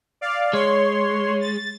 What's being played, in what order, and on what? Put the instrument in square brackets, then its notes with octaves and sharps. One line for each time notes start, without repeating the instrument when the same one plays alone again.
[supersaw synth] D5 F5
[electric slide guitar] G#3 [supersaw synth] C#5 C6
[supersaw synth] A6